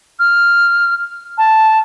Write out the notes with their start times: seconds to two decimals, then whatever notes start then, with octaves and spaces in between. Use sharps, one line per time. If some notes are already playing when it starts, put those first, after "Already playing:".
0.19 F6
1.38 A5